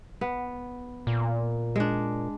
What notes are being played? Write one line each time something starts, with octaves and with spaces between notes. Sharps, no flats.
B3
A#2
G#3 D4